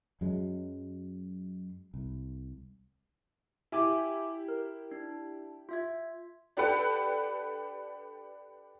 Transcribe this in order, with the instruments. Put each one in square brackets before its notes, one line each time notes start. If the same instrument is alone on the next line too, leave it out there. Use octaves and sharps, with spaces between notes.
[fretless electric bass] F#2 F#3 G#3
C2
[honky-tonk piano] E4 G4 [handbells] E5 G#5 D6
[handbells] A#4
D4
F4 E5 G#6
[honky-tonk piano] D4 G4 A4 B4 F#5 G5